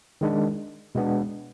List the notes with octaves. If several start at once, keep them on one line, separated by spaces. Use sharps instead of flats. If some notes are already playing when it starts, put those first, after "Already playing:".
D#3 G#3 D4
B2 G#3 B3 D4